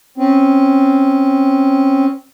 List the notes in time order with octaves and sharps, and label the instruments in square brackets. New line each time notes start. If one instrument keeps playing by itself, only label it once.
[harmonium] C4 C#4